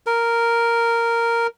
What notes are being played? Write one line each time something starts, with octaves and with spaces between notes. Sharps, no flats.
A#4